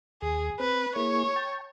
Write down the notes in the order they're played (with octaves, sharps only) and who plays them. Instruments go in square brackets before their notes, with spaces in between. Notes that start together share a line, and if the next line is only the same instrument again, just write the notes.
[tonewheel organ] D#2 [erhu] G#4
[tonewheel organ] C4 [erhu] B4
[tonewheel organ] A#3 E4 G#4 [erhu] C#5
[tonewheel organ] G5 A5